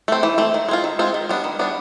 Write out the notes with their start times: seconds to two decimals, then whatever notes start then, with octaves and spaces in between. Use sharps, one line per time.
0.08 A3 C4
0.23 E3
0.38 A3 C4
0.54 D#3
0.69 G#3 C4 F4
0.84 D#3
0.99 G#3 C4 F4
1.14 D#3
1.29 G3 B3 D4
1.44 D#3
1.59 G3 B3 D4